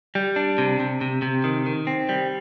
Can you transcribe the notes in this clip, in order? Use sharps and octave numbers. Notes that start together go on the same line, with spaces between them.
G3
D4
C3
C3
C3
C3
D#3
D#3
C4
G3